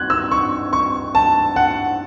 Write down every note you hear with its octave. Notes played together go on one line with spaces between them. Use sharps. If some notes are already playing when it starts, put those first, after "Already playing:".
Already playing: F#6 G#6
E6
C#6
C#6
A5
F#5